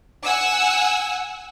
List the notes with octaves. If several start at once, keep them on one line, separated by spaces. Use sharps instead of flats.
F#5 G#5 E6